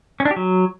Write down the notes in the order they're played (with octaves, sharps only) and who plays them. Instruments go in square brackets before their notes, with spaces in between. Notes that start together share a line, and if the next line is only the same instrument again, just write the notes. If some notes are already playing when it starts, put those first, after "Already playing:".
[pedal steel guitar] C#4
D4
G4
F#3